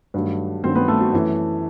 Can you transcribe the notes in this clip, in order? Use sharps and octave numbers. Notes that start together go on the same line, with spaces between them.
G2 D#3 F#3 A3
G2 D#3 F#3 A3 C4 C5
B3 B4
A3 A4
F#4
F#2 E3 A3